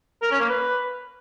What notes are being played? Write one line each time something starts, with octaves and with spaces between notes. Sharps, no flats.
A#4
C#4
A#3
B4